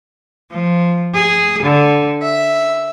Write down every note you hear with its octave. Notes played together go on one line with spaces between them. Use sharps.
F3
G#4
D3
E5